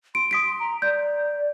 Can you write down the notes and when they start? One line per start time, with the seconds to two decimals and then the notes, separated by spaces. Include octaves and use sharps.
0.15 C6 D7
0.31 D#6 B6 D7
0.60 A#5
0.82 D5 G6